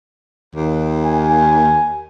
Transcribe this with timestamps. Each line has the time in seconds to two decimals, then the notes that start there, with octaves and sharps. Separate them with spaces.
0.55 D#2
1.05 G#5